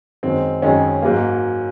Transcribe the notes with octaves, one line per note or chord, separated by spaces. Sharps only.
F#2 D#3 G#3 C4
F#2 D#3 G#3 C#4
G#2 F#3 A#3